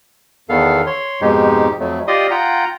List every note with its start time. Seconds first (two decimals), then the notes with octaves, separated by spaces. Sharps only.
0.49 E2 D#3 B3 A4 F5
0.87 C#5 C6
1.21 F2 G#2 B2 G#3 D#4 G4
1.80 F2 F#3 A3
2.08 F4 G4 D5 D#5 C6 D#6
2.31 F4 F#5 G5 A#5